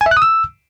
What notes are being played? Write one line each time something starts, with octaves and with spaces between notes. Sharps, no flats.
G#5
E5
F#6
D#6
E6